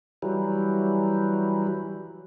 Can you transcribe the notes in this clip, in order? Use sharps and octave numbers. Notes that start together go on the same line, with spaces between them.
E3 F#3 G3